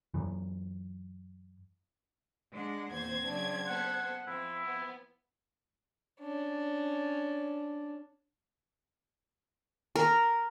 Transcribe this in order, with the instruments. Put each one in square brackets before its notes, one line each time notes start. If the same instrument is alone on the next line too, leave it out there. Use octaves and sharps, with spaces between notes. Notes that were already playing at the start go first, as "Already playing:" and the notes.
[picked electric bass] F#2 E3
[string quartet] G#3 D4 F#5
[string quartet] E2 A#2 C5 [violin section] C4 G#6
[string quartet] C#3 F#3 D4
[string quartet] B3 A4 C5 [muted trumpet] F#5
[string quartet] F3 C4 [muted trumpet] E4
[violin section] B3
[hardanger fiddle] C#4 D4
[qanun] A#4